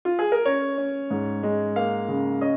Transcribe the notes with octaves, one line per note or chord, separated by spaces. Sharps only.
F4
G#4
A#4
C#4 C#5
C#4
G#2
G#3
A#3 F5
C#3
C#4 D#5